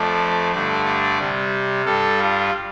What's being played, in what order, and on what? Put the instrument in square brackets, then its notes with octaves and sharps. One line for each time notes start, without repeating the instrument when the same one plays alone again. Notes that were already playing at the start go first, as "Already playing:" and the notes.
Already playing: [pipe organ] F2 F3 A3 D5
G2 D3 A3 D5
D5
C3 G3
G2 G3 A4
F4